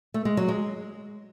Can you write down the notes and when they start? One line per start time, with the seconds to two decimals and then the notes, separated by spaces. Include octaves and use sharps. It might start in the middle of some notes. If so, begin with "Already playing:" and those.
0.14 A3
0.25 G#3
0.37 F#3
0.49 G#3